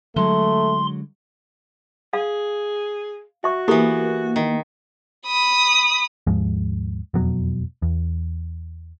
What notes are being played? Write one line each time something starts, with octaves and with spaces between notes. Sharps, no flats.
D3 F#3 G#3 A3 C6
G#4 F5
F#4 E5 C#6
E3 A#3 B3 E4 G4 A4
D#3
B5 D#6
D#2 G#2 F3 G#3
E1 F2 B2 F#3
E2